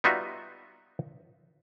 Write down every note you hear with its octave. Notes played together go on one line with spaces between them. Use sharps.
G3 B3 D#4 F4 F#4 E5